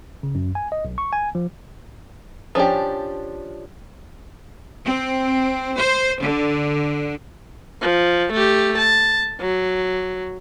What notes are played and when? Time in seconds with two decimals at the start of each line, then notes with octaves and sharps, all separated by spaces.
0.23 C#3
0.35 F#2
0.55 G#5
0.72 D#5
0.85 B1
0.98 C#6
1.13 G#5
1.35 F3
2.55 F3 C#4 D4 G4
4.85 C4
5.77 C5
6.22 D3
7.82 F3
8.33 A3 G4
8.78 A5
9.40 F#3